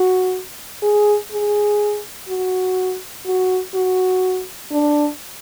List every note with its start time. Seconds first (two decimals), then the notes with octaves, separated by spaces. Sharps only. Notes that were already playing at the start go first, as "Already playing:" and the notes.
Already playing: F#4
0.82 G#4
1.32 G#4
2.28 F#4
3.26 F#4
3.75 F#4
4.72 D4